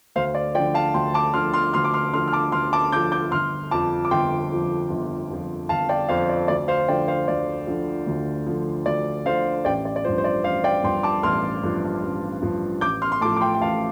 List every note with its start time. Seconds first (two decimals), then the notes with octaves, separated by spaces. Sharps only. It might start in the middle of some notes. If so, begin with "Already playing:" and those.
0.15 D2 C5 F5
0.35 D5
0.55 F3 D5 G5
0.59 D3
0.74 F5 A5
0.94 D2 G5 C6
1.14 A5 D6
1.34 D3 F3 C6 F6
1.53 C6 F6
1.74 D2 C6 F6
1.84 D6
1.94 C6 F6
2.13 D3 F3 C6 F6
2.28 F6
2.33 A5 D6
2.52 D2 C6 F6
2.73 A5 D6
2.92 D3 D6 G6
2.96 F3
3.12 D6 G6
3.31 G1 C6 F6
3.71 F2 F3 A5 D6
4.05 D6
4.11 G1 G5 C6
4.51 F2 F3
4.90 G1
5.30 F2 F3
5.69 G1 F5 A5
5.89 D5 G5
6.08 F2 F3 C5 F5
6.29 D5
6.48 D2 D5
6.68 C5 F5
6.88 D3 F3 D5 G5
7.08 C5 F5
7.28 D2 D5
7.67 D3 F3
8.06 D2
8.46 D3 F3
8.86 D2 D5
9.25 D3 F3 C5 F5
9.65 A1 D5 G5
9.85 D5
9.96 D5
10.05 G2 F3 C5
10.18 C5
10.24 D5
10.44 A1 C5 F5
10.64 D5 G5
10.83 G2 F3 G5 C6
11.03 A5 D6
11.23 A1 C6 F6
11.63 G2 F3
12.03 A1
12.42 G2 F3
12.81 A1 D6 G6
13.02 C6 F6
13.12 C6
13.21 A2 A5 D6
13.25 F3
13.36 D6
13.41 G5 C6
13.55 G5
13.61 A1 F5 A5